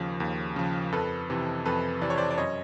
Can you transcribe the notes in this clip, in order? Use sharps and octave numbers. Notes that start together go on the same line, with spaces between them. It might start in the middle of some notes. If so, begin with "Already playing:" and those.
Already playing: D#2 C#3 F3
D#2
C#3 F3
F2 A4 B4
C3 E3
F2 A4 B4
C3 E3 D5
C#5
C5 D5
D5
F#2 C#5 D#5